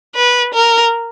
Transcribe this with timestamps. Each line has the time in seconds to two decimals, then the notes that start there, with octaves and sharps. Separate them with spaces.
0.16 B4
0.54 A#4